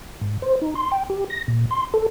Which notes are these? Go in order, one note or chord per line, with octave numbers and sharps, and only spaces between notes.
G#2
C5
D#4
C6
G5
G4
A#6
A#2
C6
A4